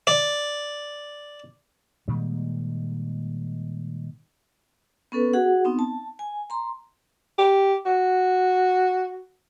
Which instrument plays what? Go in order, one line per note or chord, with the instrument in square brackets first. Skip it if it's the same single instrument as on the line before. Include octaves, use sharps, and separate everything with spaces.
[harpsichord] D5
[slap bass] A#2 D#3 G3 G#3
[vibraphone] B3 C#4 A4 B4
F#4 G#4 F#5
B3 C4 D#4
A5
G#5
A#5 C6
[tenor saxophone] G4
F#4